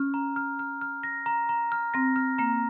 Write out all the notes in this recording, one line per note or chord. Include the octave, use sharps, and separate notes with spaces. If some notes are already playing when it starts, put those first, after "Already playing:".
Already playing: C#4 F6
A#5
F6
F6
F6
A#6
A#5
A#5
F6
C4 A#6
F6
A#3 A#5